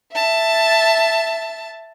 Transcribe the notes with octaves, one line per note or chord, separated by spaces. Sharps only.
E5 A5